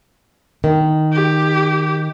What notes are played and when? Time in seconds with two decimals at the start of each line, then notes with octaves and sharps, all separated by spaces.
0.64 D#3
1.12 G4